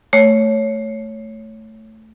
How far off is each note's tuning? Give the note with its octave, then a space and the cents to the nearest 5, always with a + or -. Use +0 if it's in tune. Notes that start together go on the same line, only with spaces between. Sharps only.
A3 +0 C#5 +0